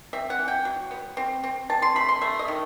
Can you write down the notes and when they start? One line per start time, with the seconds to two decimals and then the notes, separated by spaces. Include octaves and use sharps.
0.13 C4 E5
0.30 F#5
0.39 E3
0.48 G5
0.65 F#3
0.91 B3
1.17 C4
1.44 C4
1.70 C4 A5
1.82 C6
1.95 A3 B5
2.09 C6
2.22 A3 E5
2.39 D#5
2.48 D#3